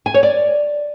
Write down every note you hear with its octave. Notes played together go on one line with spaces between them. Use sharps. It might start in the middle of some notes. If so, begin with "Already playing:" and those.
G#5
C#5
D5